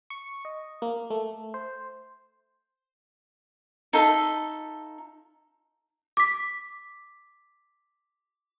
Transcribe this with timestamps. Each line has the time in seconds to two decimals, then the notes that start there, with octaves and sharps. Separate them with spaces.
0.10 C#6
0.45 D#5
0.82 A#3
1.10 A3
1.54 C5
3.93 D#4 F4 A4 E5
6.17 D6 B6